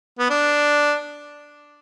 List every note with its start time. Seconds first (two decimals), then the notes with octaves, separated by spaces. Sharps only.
0.19 B3
0.30 D4